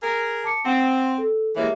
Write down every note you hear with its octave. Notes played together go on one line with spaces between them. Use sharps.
G#4 A#4
A5 D6 C#7
C4 F#5
A4
E3 G#3 A#3 G4 C#5 E5